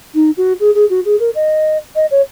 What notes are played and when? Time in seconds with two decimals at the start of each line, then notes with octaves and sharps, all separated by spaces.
0.14 D#4
0.37 F#4
0.60 G#4
0.75 G#4
0.90 F#4
1.05 G#4
1.19 A#4
1.35 D#5
1.95 D#5
2.11 C#5